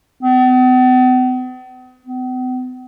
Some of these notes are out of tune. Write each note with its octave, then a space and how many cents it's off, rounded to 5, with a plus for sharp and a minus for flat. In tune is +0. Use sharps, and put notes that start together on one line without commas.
B3 +45
B3 +45